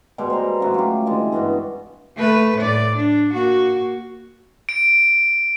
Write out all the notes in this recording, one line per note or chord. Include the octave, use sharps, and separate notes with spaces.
B2 G3 G#3
C5 A#5
C#3 F#3 A3
F4 G4
D3 E3 G#3
G2 B3 F#4 D#5
A3 B4
A2 D5
D4
A#3 F#4
D7